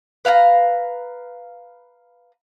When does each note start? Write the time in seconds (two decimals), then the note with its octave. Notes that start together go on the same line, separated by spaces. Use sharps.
0.25 B4 F5 G5 A#5